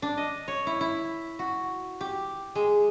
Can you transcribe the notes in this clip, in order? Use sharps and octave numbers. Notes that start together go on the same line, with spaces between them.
D4
D#5
C#5
E4
E4
F#4
G4
G#3